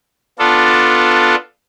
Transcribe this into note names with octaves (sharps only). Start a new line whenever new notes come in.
B3 D4 F4 A4